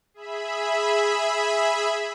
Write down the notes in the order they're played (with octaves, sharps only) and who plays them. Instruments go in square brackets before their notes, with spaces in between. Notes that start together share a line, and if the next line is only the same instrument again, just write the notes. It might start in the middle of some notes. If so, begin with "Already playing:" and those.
[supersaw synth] G#4 E5 B5